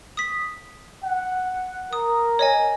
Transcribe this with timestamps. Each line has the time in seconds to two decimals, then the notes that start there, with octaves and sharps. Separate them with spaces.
0.17 D#6 B6
1.04 F#5
1.93 A#4 D#6
2.39 C#5 D#5 G#5